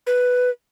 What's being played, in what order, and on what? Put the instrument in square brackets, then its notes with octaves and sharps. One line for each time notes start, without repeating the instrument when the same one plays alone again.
[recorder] B4